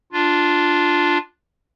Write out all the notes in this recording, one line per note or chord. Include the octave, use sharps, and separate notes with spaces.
D4 F4